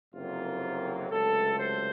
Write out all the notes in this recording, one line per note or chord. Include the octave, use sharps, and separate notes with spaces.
F#1 F2 C3 F#3 A#3 F4
C#2 C3 F#3 A3 A4
C5